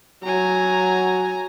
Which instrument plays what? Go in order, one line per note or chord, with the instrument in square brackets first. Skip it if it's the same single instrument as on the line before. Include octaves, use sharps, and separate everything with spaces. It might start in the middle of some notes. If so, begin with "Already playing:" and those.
[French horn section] F#3 [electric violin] G#5 A#5